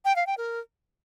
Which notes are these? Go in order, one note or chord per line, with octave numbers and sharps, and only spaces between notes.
G5
F5
G5
A#4